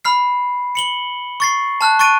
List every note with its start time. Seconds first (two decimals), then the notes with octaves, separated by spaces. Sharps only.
0.05 B5 F6 C7
0.75 C#7 F#7 G7
1.40 C#6 A6 C7
1.81 A5 F6 F#6
1.99 C#6 F#6 A6 D7 D#7